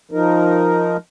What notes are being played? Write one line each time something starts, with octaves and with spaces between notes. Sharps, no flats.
F3 D#4 A#4